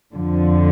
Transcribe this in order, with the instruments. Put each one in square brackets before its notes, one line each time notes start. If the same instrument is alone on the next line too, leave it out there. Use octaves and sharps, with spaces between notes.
[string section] F2 D3 F3